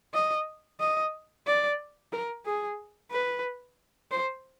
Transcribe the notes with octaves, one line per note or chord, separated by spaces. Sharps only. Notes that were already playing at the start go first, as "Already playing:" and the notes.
D#5
D#5
D5
A#4
G#4
B4
C5